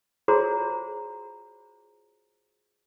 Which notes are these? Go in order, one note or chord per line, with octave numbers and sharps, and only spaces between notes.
F4 F#4 G#4 C5 C#5 A#5